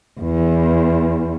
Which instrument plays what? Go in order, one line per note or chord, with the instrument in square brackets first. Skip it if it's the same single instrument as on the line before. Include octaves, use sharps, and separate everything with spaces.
[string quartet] E2